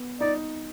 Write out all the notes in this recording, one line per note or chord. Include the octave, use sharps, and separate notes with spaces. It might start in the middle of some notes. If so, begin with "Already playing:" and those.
Already playing: B3
D#4 D5